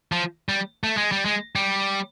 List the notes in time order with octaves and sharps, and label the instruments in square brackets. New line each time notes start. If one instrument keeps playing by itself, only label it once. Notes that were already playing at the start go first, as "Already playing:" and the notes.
[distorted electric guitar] F3
G3
A3
G#3
G3
G#3
G3